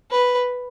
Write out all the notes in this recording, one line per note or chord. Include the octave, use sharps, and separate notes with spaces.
B4